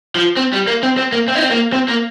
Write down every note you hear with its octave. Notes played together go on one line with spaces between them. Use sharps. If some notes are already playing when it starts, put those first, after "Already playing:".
F3
C4
G3
A#3
C4
C4
A#3
C4
D#4
C4
A#3
C4
A#3